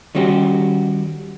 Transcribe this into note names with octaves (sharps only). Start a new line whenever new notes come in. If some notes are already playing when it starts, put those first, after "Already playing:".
D#3 G3 C#4 F#4 G4